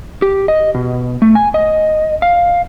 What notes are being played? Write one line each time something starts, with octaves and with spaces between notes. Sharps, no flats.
G4
D#5
B2
A3
G#5
D#5
F5